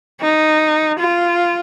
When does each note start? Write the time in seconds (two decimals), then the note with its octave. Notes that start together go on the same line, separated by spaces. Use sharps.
0.21 D#4
0.99 F4